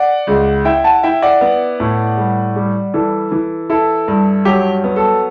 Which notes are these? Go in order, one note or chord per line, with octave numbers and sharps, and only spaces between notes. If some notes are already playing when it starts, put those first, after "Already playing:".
Already playing: D5 F#5
C#2
E4 E5 G5
F#5 A5
E4 E5 G5
D5 F#5
B3
A2
G3
G3
E3 A4
E3
E4 A4
G2
F#3 G4
B3
A4